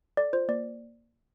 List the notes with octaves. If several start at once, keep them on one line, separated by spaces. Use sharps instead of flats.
A4 D5
F4 C5
A#3 D5